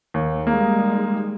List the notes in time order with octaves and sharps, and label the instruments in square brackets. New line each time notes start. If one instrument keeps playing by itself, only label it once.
[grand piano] D#2
[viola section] G3 G#3 D#4 [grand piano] A#3